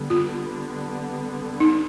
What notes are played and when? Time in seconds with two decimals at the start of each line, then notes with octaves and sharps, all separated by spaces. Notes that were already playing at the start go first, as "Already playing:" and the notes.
Already playing: D3 G3 B3
0.10 F4
1.60 D#4